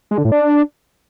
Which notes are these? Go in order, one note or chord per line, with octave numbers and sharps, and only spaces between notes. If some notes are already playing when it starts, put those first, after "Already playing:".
G#3
D3
A2
D4